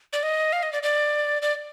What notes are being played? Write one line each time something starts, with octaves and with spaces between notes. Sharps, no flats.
D5
D#5
F5
D#5
D5
D5
D5